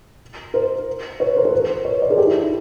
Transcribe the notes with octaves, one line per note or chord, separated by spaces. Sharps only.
A#4 C5
B4 C#5
A#4 C5
A4 B4
A#4 C5
B4 C#5
C5 D5
G#4 A#4
G4 A4
E4
E4